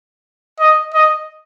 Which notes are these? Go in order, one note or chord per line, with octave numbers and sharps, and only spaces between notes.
D#5
D#5